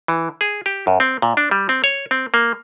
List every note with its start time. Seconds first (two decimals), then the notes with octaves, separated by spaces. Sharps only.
0.08 E3
0.41 G#4
0.66 G4
0.87 F#2
1.00 C4
1.22 A#2
1.37 D4
1.51 G3
1.69 C4
1.84 C#5
2.11 C4
2.34 A#3